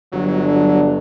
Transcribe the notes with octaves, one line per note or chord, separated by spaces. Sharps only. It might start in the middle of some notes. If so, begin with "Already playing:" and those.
G1 F#3
D3